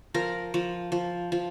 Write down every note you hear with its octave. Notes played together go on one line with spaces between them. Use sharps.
F3 A#4
F3
F3
F3